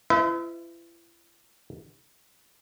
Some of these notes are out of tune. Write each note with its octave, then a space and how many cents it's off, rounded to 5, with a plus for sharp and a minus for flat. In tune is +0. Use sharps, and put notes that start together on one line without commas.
E4 +40 B4 +45 E5 -35